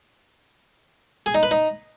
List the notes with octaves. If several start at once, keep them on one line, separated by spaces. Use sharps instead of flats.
G#4
D#4
B4
D#4